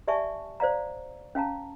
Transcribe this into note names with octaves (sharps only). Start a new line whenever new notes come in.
G4 D5 E5 G#5 A5 C#6
C5 D5 F5 A#5
C#4 F5 A5 A#5